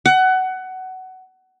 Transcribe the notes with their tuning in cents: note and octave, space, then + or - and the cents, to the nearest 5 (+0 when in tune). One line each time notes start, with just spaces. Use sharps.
F#5 +20